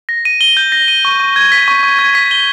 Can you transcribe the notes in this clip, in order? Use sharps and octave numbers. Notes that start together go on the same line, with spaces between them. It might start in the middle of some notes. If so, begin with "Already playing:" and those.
A#6
D#7
G7
G6
A#6
D#7
C#6
C#6
G#6
B6
C#6
C#6
G#6
B6
G7